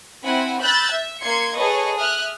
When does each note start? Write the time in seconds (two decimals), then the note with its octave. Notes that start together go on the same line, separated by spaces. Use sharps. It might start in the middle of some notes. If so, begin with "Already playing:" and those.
0.23 C4 E4 F#5 G#5 B5
0.60 B5 E6 F#6 G6 A6
0.91 E5
1.23 A#3 C6 G#6 C#7
1.55 G#4 A4 B4 C#5 D#5 C#6
1.97 E5 D#6 F6 F#6